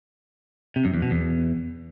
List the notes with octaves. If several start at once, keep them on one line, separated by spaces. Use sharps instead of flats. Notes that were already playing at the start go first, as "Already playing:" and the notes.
C3
F#2
E2
B2
E2